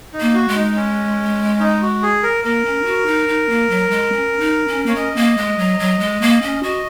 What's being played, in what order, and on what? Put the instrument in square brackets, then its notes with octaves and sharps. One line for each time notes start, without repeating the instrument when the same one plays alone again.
[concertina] D#4
[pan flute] A#3
[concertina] F#4
[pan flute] G#3
[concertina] D#4
C#4
D#4
F#4
G#4
A#4
[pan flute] A#3 [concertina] A#4
[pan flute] C#4
D#4
F#4
D#4
D#4
A#3
F#3
G#3
C#4
D#4
C#4
[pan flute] A#3 [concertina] C#5
[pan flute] C#4 [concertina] D#5
[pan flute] A#3
G#3
F#3
F#3
G#3
A#3
C#4
[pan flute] F#4 [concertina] D#5